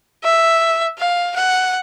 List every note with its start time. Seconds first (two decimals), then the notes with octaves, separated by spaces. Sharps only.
0.24 E5
0.98 F5
1.36 F#5